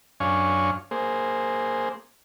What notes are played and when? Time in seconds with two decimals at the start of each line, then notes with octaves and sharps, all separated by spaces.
0.20 F#2 D4 C#5 F5 G#5 C#6
0.91 A#3 G#4 C5